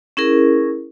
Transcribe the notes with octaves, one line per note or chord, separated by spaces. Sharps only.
C#4 E4 G#4 A#4